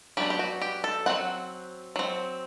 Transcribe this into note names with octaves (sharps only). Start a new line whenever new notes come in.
F#3 B3 D4 G4
G4
F#4
G4
A4
F#3 C4 F#5
F#3 C4